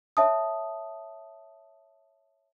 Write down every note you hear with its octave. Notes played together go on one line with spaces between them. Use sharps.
C#5 E5 A5 D#6